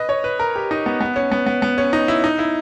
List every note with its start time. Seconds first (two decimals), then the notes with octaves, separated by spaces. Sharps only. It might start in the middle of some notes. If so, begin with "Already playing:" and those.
Already playing: B4 D#5
0.09 C#5
0.24 B4
0.39 A#4
0.56 G4
0.71 D#4
0.86 B3
1.01 B3
1.16 C#4
1.32 B3
1.46 B3
1.62 B3
1.78 C#4
1.93 D#4
2.08 E4
2.24 D#4
2.39 E4